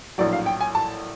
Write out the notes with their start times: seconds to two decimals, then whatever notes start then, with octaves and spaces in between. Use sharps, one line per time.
0.18 A#1 A2 F#3 D5
0.33 F5
0.46 G5
0.61 G#5
0.75 A5